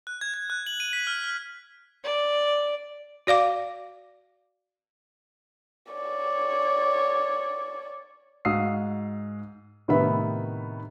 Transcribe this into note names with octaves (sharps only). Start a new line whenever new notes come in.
F#6
G#6
G#6
F#6
F#7
D#7
B6
F6
F6
D5
F#4 D5 F5 D6
C#5 D5
G#2 F#4 F5 D#6 E6 C7
A2 C3 D#3 B3 E5 B5